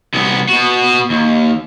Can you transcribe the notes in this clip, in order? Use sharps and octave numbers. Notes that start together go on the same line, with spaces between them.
C2 B3
B2 F#4
D#2